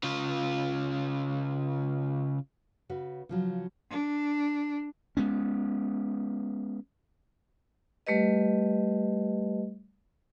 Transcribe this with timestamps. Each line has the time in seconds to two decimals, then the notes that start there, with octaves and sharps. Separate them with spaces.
0.04 C#3 F4
2.89 C#3 F#4 B4
3.29 C#3 F3 F#3
3.90 D4
5.17 G#3 B3 C#4
8.07 G3 A3 G4 B4 D#5